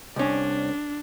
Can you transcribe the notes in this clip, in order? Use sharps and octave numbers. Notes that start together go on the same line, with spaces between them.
C2 C#4 D4